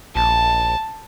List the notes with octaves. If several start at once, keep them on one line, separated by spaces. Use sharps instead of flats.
A#1 A5